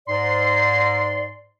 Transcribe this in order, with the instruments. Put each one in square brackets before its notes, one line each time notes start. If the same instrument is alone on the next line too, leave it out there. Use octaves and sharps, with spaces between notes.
[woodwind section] G#2 C6 [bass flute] D5